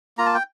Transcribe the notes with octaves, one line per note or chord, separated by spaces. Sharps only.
A#3 F4 A#5
A5
G5